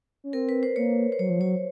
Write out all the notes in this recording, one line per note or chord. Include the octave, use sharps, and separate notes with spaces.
C#4
C4 A#4
B4
C5
A#3 C#5
C5
F#3 C#5
F3
F#3 C#5